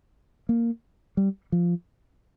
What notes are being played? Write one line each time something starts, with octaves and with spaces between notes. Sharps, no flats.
A#3
G3
F3